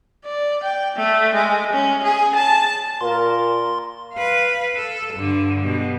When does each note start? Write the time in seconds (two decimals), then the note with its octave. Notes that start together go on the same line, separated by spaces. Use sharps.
0.25 D5
0.63 G5
0.96 A3
1.34 G#3
1.72 C#4
2.03 G#4
2.35 A5
3.01 A#2 F4 A#4 C6
4.13 B4 F5
4.75 A4
5.14 G2 D3
5.61 B2 G3